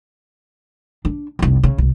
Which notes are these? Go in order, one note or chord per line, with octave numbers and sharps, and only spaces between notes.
D4
F1 C2
C#3
C2